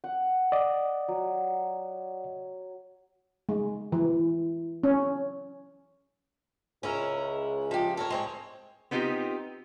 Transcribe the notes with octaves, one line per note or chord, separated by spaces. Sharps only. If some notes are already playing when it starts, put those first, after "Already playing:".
F#5
D5 D#5
F#3
G#3
E3
C#4
C#2 C#4 E4 A#4
F3 G4
A4 A#4 C#5
G#3 C4 C#5
B3 C4 D#4 F4 G4